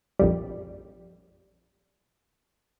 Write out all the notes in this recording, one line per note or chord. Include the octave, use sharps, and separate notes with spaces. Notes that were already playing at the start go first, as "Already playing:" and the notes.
A#1 F2 G3